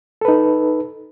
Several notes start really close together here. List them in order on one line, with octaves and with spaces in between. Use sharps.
A4 B4 D#4